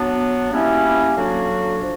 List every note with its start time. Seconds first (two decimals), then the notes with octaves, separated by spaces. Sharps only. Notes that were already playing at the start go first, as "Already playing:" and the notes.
Already playing: F#3 B3 D4
0.50 G3 A#3 C#4 E4
1.16 D3 F#3 A#3 D4 F#4
1.81 F3